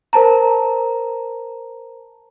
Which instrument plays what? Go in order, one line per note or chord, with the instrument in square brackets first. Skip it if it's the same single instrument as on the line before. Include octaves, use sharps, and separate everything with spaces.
[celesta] A#4 C5 A5 A#5